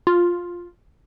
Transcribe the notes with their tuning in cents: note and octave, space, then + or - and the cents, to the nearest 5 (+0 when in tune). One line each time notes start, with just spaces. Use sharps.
F4 +5